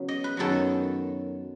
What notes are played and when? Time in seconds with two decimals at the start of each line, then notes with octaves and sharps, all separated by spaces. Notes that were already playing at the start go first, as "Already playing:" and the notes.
Already playing: C#3 F#3 B3
0.08 D#5
0.24 B4
0.37 F#2 D#3 F#3 B3 A4